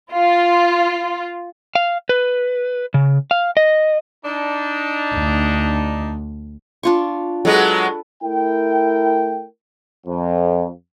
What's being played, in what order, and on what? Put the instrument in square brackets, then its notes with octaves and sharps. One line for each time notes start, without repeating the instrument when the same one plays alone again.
[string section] F4
[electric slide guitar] F5
B4
C#3
F5
D#5
[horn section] D4 D#4
[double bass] D2
[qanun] D4 F4 C#6
[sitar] F#3 G#3 B3 [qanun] A4 B4
[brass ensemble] A3 E4 A#4 G5
F2